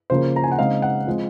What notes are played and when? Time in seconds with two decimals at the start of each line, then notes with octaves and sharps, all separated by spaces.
0.10 C#3 F3 A#3 C5
0.36 A#5
0.44 G#5
0.52 F#5
0.58 C#3 G#3 C4 D#4 F5
0.82 F#5
1.07 F3 G#3 C4